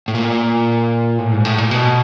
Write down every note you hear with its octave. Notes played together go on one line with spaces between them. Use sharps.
A2
A#2
A2
G#2
A2
A#2
B2